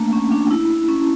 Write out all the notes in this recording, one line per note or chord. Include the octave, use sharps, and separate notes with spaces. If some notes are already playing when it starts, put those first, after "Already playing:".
Already playing: A3 A#3 D4
C#4
D4
E4
C#4